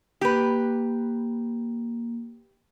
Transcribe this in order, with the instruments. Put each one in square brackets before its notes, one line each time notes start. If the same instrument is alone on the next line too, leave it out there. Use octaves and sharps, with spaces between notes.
[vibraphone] A#3 [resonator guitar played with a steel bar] G4 B4